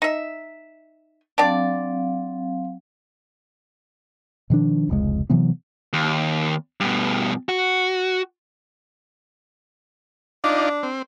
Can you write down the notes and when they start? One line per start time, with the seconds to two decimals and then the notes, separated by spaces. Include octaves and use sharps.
0.02 D#4 E5
1.38 F#3 C4 D4 G4 D5 F5
4.50 B2 D#3 F3 D4
4.89 F1 C#2 G#3
5.30 C3 E3 F#3 B3
5.93 D#2
6.80 G2 B2
7.49 F#4
10.44 D4 D#4 F4 D5
10.83 C4